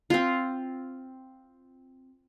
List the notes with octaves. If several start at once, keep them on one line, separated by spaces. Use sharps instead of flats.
C4 F4